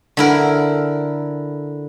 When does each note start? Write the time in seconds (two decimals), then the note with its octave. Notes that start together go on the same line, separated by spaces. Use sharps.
0.17 D3 E4 A#4